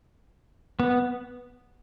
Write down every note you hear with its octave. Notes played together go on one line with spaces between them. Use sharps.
B3